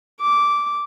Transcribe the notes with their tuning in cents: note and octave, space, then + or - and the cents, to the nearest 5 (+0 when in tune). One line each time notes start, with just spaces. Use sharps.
D6 -10